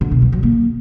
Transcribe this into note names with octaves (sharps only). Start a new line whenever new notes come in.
D3
B2
G3
F#3
A#3